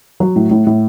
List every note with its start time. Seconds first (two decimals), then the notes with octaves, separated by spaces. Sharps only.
0.20 F#3
0.36 A2
0.51 A2
0.67 A2